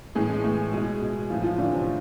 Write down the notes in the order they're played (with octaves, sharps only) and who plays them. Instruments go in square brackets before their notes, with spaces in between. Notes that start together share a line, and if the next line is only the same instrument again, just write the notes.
[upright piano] A2 E3 G#3 G#4
G#3 G#4
A2 E3
B2 G#3 G#4
B2
A2 E3 F3 F4
F3 F4
A2 D3 E3 D4
C3 C4